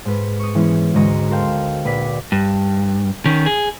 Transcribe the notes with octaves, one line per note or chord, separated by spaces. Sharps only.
G#2 B4
C#6 D#6
E3 G#3 B3 C#4
D2 G#2 G#3 D#5 A#5 C#6
A4 A#4 C5 F5 G5
A#1 B4 D5 B6
G2
D#3 C#4
G#4